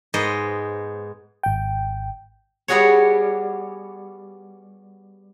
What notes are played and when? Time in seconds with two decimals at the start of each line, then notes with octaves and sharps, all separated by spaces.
0.14 G#2 B3 C5 D#5
1.43 G#1 G5
2.68 G3 B3 F#4 G#4 C#5